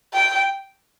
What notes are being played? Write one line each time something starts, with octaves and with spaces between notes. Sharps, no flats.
G5